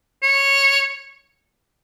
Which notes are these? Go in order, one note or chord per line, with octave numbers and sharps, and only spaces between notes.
C#5